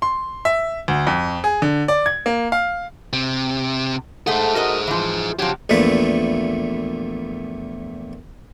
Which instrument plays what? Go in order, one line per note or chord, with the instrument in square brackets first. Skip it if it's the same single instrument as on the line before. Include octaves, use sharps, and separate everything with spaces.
[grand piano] C6
E5
D2
F2
G#4
D3
D5
G#6
A#3
F5
[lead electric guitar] C3
[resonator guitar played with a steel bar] G#2 A3 F#5 [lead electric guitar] G#4 C5
[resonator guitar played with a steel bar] F#4 A#4 D#5
E3 F3
[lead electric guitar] C3 G4 [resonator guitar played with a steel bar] F3 F#3
[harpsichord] A#1 E2 A#2 A3 B4 E5